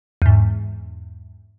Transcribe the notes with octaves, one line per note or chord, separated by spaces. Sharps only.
E2 G#2